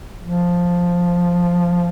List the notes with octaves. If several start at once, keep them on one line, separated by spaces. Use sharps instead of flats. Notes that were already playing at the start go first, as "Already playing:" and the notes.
F3